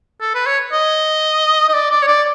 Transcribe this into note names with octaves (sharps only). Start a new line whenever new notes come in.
A4
B4
C#5
D#5
D#5
D5
D5
C#5
D5